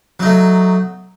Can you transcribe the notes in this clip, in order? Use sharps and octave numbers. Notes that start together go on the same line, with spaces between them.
F#3 A3 D#4